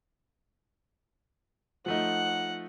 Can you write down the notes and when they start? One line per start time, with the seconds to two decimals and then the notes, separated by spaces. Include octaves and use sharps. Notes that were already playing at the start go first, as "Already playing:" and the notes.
1.86 F3 A3 D#4 F#5